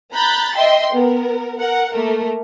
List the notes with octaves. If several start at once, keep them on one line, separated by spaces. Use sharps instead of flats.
A#5 B5 F#6 G6 A6
D#5 E5 G5 C6
B3 A#4
A#4 F#5
A3 A#3 A#4